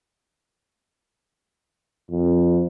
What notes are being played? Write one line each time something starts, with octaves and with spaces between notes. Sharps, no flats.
F2